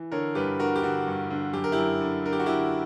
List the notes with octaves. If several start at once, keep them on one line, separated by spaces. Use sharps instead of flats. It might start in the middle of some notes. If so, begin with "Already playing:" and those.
Already playing: E3
D3 A#4 C#5
G2 G4 B4
D3 F#4 A#4
G4
D3 F#4
G2
D3
F#2 G4
A#4
E4 G4
F#2
D3
D3 A#4
G4
F#4
D3 E4 G4